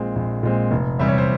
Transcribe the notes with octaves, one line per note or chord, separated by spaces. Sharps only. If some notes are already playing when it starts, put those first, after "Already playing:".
Already playing: A#1 A#2 G#3 C4 G#4
A#1
A#2 G#3 C4
F1
E2 C3 G3 E5
C#5
C5